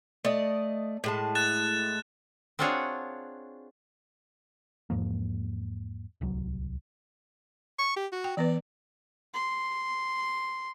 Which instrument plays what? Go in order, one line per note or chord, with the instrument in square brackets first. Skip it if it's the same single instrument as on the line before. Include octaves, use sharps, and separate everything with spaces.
[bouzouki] A3 D5 D#5
A2 G#3 A5
[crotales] F#6 A6 E7
[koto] C4 D4 F4 F#4 G#4 C#5
[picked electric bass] E2 G#2 F3 A#3
D1 C2 F#3
[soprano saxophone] C#6
G4
F#4
[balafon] G5
[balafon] E3 B3 B4 [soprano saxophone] D5
[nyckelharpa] C6